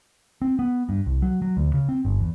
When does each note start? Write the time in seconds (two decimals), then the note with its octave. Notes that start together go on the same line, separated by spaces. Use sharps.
0.42 C4
0.59 B3
0.89 G2
1.06 C2
1.22 F#3
1.42 F#3
1.57 D2
1.74 C#3
1.89 C4
2.05 G1
2.19 E2